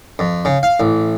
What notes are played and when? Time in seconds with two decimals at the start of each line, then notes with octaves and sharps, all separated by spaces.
0.19 F2
0.45 C#3
0.63 F5
0.80 A1